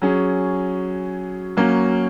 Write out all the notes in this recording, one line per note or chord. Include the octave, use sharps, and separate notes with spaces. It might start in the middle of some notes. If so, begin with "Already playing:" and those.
F#3 C#4 G#4
F#3 A#3 C#4